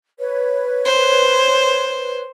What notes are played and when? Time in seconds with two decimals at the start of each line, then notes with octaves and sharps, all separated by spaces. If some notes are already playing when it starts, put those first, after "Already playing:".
0.19 B4 C#5
0.85 C5